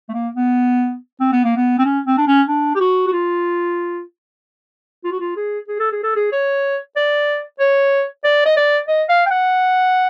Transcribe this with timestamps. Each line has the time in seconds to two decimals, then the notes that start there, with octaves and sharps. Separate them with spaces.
0.09 A3
0.13 A#3
0.36 B3
1.20 C4
1.32 B3
1.44 A#3
1.56 B3
1.79 C4
1.85 C#4
2.06 C4
2.18 D4
2.27 C#4
2.48 D4
2.75 G4
2.80 F#4
3.07 F#4
3.12 F4
5.04 F4
5.12 F#4
5.20 F4
5.36 G#4
5.68 G#4
5.79 A4
5.92 G#4
6.03 A4
6.16 G#4
6.32 C#5
6.97 D5
7.60 C#5
8.24 D5
8.46 D#5
8.57 D5
8.88 D#5
9.09 F5
9.26 G5
9.31 F#5